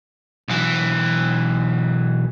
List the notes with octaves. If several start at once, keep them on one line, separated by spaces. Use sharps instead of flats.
B1 E3